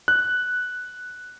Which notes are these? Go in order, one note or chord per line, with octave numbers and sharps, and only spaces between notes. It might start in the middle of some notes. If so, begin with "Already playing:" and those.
F#6